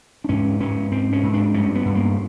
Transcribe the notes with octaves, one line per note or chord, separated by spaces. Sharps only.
D4
G#2 C#4
G#2 C#4
G#2 C4
C#4
G#2
D4
G2 C#4
B3
G2
A#3